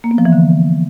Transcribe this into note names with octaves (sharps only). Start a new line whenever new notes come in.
A#3
B3
F3
E3
D3